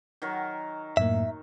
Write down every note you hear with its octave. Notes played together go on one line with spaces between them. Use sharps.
D#3 F#3 A#4
F#2 A2 A#3 E5